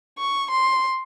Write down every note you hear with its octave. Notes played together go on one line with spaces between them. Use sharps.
C#6
C6